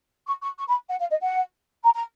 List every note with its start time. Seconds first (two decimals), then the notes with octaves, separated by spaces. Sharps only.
0.26 C#6
0.42 C#6
0.58 C#6
0.68 B5
0.89 F#5
1.00 F5
1.10 D#5
1.21 F#5
1.83 A#5
1.94 A#5